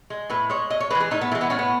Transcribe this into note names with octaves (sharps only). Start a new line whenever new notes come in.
G#3
A2 B4
G#3 C#5
A2 D#5
C#5
E3 G#3 B4
G#4
A2 D#4
B3
E3 G#3 A3
B3
A2 C#4
B3